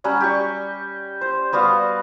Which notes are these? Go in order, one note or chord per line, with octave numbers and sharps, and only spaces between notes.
F#3 G3 C#4 F#5
G4 C#6
C5
G3 B3 F#4 F5